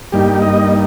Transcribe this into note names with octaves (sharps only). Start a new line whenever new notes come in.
G2 G3 A#3 D#4 G4
D#5